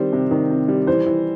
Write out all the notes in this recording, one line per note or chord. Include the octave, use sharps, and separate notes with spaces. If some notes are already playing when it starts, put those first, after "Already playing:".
Already playing: D#3 G3 C4 C5
C3
D#3
C3
G3
E3 C5
E3